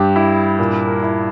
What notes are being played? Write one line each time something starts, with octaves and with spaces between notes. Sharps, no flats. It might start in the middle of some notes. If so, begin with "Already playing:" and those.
Already playing: G2 G4
E4
A#2
A#4
E4